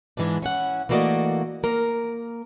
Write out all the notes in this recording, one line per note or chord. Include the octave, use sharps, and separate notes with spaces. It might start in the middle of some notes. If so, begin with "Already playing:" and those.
G#2 E3 G#3 B3 D4
C#4 E4 F#5
E3 A3 A#3 F#4 D5 D#5
A#3 A#4